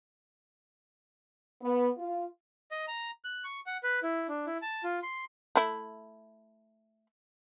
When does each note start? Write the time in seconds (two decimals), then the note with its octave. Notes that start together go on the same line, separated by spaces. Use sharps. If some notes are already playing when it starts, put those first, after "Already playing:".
1.61 B3
1.98 F4
2.71 D#5
2.88 A#5
3.24 F#6
3.44 C#6
3.66 F#5
3.83 B4
4.03 E4
4.29 D4
4.47 E4
4.62 A5
4.84 F4
5.03 C6
5.56 A3 E4